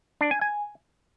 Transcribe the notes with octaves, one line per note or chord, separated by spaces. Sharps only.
D4
G#5
G#5